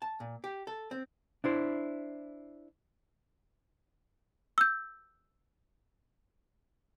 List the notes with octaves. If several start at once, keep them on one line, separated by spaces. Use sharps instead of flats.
A5
A#2
G4
A4
C4
D4 E4 C5
E6 G6